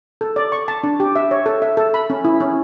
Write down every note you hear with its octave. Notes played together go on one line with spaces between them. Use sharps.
A4
D5
C#6
A5
D4
G4
E5
C#5
A4
E5
A4
B5
C#4
E4
C#4